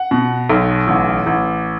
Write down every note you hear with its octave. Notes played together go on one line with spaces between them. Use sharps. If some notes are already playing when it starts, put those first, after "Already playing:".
Already playing: F#5
B2
B1
A1
A1